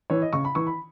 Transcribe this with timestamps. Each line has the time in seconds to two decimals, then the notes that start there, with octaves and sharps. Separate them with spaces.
0.10 E3 C#5
0.22 D#5
0.33 C#3 C#6
0.45 B5
0.55 E3 C#6
0.67 B5